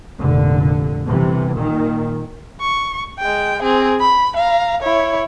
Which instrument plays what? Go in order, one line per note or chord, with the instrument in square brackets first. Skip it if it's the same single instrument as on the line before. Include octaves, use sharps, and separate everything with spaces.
[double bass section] F1 A#2 D3
G1 C3 E3
A#2 D#3
[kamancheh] C#6
G#3 G5
C4 G#4
B5
F5 A#5
E4 C#5